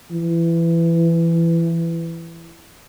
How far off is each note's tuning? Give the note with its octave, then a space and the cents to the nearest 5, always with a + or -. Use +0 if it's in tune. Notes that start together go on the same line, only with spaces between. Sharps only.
E3 +20